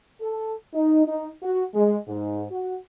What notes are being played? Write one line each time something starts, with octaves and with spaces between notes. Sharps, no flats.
A4
D#4
D#4
F#4
G#3
G#2
F#4